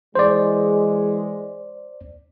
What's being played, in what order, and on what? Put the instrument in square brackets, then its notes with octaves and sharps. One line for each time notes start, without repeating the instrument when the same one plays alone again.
[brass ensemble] E3 G#3 [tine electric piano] C5 D5